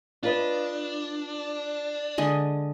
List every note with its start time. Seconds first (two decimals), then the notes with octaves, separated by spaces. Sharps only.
0.23 D4 F4 B4 D#5
2.18 D3 G#3 D#5